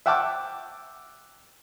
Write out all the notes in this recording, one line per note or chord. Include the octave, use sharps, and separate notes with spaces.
E5 F#5 G5 A5 D6 F6